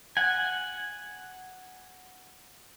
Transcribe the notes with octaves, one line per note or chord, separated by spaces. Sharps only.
F#5 G#5